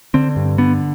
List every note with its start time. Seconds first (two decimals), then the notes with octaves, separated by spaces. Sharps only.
0.14 D3 C4
0.36 G2
0.58 D3 B3